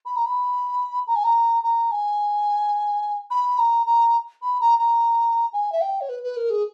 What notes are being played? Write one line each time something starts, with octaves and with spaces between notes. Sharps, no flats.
B5
A#5
B5
A#5
G#5
A#5
A#5
G#5
B5
A#5
A#5
B5
A#5
A#5
G#5
E5
G5
C#5
B4
B4
A#4
G#4